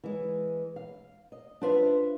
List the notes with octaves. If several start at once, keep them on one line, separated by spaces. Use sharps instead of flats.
E3 G#3
F5
D#5
D4 F4 B4 C5 E5 F5